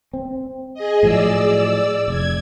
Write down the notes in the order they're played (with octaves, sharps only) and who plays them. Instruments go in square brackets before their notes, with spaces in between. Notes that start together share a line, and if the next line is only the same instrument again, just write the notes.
[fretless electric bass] C4
[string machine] G#4 D#5
[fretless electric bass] A2 F3 F#3 [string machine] D5 E6
[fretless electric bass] F1 [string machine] G#6